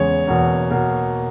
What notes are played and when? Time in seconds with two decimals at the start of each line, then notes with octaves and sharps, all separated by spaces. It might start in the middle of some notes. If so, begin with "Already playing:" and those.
Already playing: E2 C#3 G#3 C#5
0.27 E2 B2 A#3
0.71 B2 A#3